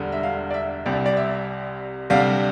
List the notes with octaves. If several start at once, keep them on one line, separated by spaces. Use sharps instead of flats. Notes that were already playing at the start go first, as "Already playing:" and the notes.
Already playing: E1 D2 D3 G3
E5
F5
D5
E5
C2 C3 G3 D5
D5
E5
D2 C3 G3 F5